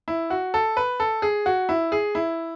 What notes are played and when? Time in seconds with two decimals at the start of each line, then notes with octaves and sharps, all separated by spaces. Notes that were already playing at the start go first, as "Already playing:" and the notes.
0.08 E4
0.30 F#4
0.54 A4
0.77 B4
1.00 A4
1.22 G#4
1.46 F#4
1.69 E4
1.92 G#4
2.15 E4